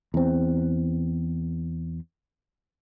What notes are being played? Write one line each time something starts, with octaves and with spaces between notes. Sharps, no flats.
E2 C4